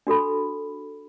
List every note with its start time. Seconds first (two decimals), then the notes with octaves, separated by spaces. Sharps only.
0.07 D4 F#4 A4 B5